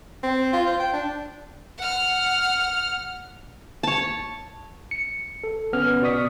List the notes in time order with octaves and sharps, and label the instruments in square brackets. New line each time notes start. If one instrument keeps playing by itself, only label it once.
[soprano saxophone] C4
F4
C5
G5
D4
[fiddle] F#5 F6
[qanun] C#5 A5
[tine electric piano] C#7
A4
G1 B3 C#4 F6
B2 D5 C#6 D#6 B6